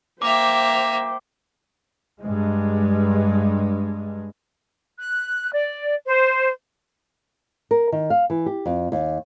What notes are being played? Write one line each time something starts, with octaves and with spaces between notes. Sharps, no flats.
A#3 C5 E5 G5 D6
G2 G#3
F#6
D5
C5
A#4
D#3
F5
E3
G4
F2
D#2